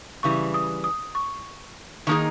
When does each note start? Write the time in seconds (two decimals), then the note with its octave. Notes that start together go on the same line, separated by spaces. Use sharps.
0.23 C#3 E3 G3 C#6
0.54 D#6
0.84 D#6
1.15 C#6
2.07 D#3 A#3 D#4 G#4